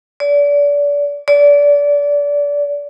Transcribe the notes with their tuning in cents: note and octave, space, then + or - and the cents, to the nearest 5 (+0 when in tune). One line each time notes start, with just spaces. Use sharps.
D5 -30
D5 -25